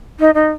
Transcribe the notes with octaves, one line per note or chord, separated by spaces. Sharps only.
D#4
D#4